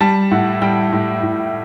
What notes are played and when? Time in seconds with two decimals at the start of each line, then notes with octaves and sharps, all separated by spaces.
0.01 G3 A5
0.31 A2 F#5
0.62 G3 G5
0.92 A2
1.23 A2